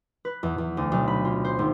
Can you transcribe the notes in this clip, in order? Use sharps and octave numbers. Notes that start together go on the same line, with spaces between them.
B4
E2
E2
D2
B1
B5
F4
C5
G#1